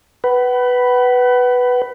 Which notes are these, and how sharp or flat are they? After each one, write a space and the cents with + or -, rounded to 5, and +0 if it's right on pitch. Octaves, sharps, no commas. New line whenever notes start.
B4 +0 F#5 +35